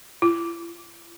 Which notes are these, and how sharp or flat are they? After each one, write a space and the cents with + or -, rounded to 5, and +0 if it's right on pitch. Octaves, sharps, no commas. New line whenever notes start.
E4 +40